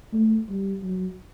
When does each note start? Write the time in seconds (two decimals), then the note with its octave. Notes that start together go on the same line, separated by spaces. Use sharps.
0.13 A3
0.48 G3
0.83 F#3